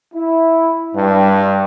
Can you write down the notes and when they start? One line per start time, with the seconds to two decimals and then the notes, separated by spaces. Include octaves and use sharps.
0.14 E4
0.95 G2